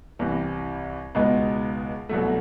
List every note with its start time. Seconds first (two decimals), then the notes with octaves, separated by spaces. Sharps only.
0.19 C2 C3 E3
1.15 C#2 B2 G#3 B3 D#4
2.09 C2 B2 F#3 A3